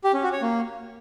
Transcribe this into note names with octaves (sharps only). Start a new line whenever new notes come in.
G4
C#4
F#4
C#5
A#3